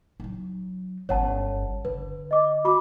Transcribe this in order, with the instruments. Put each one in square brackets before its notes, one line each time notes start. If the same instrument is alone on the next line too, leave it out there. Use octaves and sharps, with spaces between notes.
[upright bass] F#3 D#4
[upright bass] G1 C#4 [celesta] C#5 F#5 A5
[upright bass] D3 [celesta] B4
[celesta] D#5 D6
F#4 B5 D6